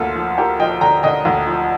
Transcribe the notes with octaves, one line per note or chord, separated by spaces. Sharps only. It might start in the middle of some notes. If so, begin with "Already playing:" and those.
Already playing: D2 A#3 F4 A4
F3
F3 G4 A#4
F3 D#5 G5
D3 G5 A#5
D3 D#5 G5
D2
F3